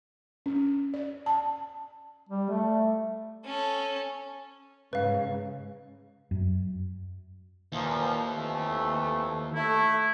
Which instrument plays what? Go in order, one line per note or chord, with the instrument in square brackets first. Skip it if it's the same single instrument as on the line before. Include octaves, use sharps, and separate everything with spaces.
[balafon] C#4
D5
A5
[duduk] G3
A3
[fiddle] C#4 A4
[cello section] G#2 C#3 [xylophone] B4 F5
[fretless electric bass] F#2
[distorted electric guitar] D#2 [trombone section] A#2 E3 F3
[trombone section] F2 E3 A3
[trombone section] A3 [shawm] E4